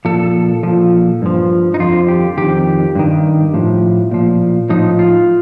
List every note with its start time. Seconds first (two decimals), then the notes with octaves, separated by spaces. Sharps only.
0.05 A#2 F3 A4
0.63 A#2 F3
1.22 G2 F3
1.74 D#4
1.79 F2 D3 F3 F4
2.08 G4
2.38 F2 D#3 G4
2.95 G2 D#3
3.54 A2 F3
4.11 A#2 F3
4.69 A2 F3 D#4
4.99 F4